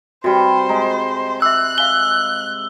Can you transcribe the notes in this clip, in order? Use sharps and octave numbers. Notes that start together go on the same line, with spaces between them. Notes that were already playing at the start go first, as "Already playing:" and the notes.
C3 G3 F#4 A4 C5
G#3 A#5
E5 D6 E6 F#6
E5 F5 G#5 G7